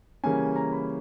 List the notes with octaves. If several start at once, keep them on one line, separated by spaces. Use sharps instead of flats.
C#3 E3 G3 A#3 C#4 G#5
A#5
B5